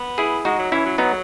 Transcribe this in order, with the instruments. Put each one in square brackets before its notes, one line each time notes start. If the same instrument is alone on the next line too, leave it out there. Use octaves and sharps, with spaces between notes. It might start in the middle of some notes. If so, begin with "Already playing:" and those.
Already playing: [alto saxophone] B3
[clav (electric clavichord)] E4 G#4
[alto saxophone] G#3 [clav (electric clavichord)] D#4 F#4
[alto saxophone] F#3
[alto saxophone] E3 [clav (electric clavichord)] C#4 E4
[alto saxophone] F#3
[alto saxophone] F#3 [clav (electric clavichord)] B3 D#4